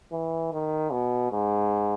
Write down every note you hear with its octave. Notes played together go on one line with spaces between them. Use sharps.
E3
D#3
B2
G#2